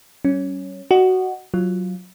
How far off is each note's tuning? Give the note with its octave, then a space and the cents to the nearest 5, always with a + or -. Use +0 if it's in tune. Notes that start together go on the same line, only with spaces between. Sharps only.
G3 -45 C#4 +0
F#4 +10 D#5 -25
F#3 +0 F4 +0